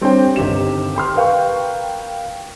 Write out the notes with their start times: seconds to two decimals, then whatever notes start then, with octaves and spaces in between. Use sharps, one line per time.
0.01 G3 C4 D4 C5 C#5 G5
0.36 G1 C3 D#3 G4 E7
0.96 G5 C6 F6
1.15 A#4 B4 F5 G5 C#6